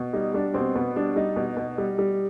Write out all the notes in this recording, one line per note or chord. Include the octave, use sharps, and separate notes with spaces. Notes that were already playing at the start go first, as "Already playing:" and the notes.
Already playing: B2
G3 D#4
G3 D4
B2 C4
B2 B3
G3 D4
G3 D#4
B2
B2
G3
G3